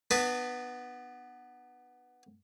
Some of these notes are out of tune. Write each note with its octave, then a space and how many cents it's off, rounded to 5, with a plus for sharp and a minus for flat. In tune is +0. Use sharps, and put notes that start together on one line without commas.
B3 +0 D4 +40 B4 +0